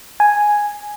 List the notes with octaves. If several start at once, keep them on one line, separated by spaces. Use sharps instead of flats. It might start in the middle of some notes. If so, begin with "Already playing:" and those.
G#5